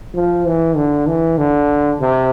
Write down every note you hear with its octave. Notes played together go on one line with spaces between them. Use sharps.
F3
E3
D3
E3
D3
C3